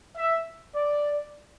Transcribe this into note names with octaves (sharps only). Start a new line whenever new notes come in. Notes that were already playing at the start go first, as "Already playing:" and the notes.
E5
D5